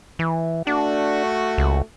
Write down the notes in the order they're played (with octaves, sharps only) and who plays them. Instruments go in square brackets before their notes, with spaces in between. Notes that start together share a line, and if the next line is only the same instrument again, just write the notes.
[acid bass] E3
[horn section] A3 F#4 [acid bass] D4
[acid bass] C#2